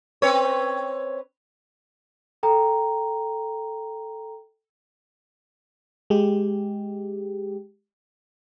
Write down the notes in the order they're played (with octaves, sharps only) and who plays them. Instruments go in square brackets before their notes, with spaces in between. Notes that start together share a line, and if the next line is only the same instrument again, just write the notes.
[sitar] C4 B4 C#5
[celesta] A4 G5 A#5
[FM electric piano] G#3 G4